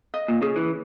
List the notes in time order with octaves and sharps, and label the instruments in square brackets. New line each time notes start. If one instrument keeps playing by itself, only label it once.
[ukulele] D#5
[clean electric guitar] A#2
[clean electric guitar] C#3 [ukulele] G#4
[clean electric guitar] E3